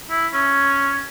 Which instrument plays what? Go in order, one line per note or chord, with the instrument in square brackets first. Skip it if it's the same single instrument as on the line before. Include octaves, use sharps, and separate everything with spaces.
[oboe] E4
C#4